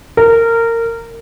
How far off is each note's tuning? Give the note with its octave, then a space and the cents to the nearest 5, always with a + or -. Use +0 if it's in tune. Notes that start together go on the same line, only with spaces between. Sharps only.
A#4 -20